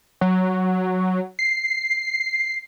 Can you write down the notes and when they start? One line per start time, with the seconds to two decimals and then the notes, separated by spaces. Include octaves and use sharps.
0.21 F#3
1.39 C7